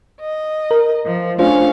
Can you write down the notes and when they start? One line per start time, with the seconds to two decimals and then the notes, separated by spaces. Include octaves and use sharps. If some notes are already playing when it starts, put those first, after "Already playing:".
0.20 D#5
0.71 A#4
1.05 F3
1.39 A3 C#4 D4 F4 C5 F5